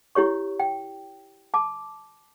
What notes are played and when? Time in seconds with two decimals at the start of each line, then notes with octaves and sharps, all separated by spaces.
0.15 E4 G4 C#5 C#6
0.60 G5
1.54 A5 D6